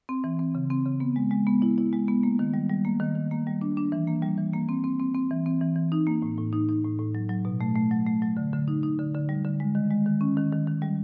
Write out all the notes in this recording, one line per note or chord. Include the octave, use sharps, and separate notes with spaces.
C4
E3
C4
C#3
C4
C#3
B3
G#3
G#3
B3
E4
E4
G#3
B3
A#3
D#3
G3
G3
A#3
D#3
D#3
A#3
G3
D4
D4
E3
A#3
G3
E3
A#3
C4
C4
C4
C4
E3
C4
E3
E3
D#4
A#3
A2
A2
D#4
D#4
A2
A2
F#3
F#3
B2
A3
A3
F#3
A3
F#3
D3
D3
D#4
D#4
D3
D3
G3
D3
G#3
D#3
G#3
D#3
C#4
D#3
D#3
D#3
G3